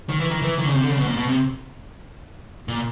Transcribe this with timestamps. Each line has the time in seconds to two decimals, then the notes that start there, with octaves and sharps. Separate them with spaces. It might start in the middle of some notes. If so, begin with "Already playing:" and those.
0.09 D#3
0.20 E3
0.30 D#3
0.42 E3
0.58 D#3
0.66 C#3
0.75 C3
0.82 D3
0.90 C#3
0.98 B2
1.06 A#2
1.17 B2
1.28 C3
2.68 A#2